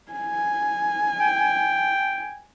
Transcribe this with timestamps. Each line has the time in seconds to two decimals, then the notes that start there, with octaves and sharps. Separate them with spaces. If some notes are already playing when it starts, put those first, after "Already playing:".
0.12 G#5
1.21 G5